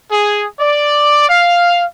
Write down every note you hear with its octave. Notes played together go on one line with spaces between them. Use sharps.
G#4
D5
F5